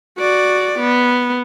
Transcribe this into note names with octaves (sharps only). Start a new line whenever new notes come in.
F#4 D5
B3